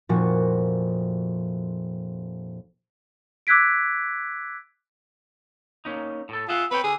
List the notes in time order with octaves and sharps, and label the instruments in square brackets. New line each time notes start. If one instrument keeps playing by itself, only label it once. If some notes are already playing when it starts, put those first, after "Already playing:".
[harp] F1 A#2 F3 F#4 C#6
[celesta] D6 E6 F#6 G#6 B6 D7
[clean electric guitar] A#3 C#4 D#4
A2 A4
[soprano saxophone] F4 [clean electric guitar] G#4 E5 F#5
[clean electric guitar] C4 C#5 G5 [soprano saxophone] B4
[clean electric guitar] D3 [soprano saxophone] G#4